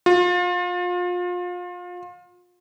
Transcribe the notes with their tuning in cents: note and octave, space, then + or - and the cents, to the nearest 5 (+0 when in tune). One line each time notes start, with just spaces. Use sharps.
F4 +30